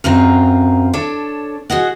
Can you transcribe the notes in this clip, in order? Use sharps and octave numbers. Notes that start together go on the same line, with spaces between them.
F#2 C4 F4 A#5
D4 A4 C#5
F#4 G#4 D#5 F#5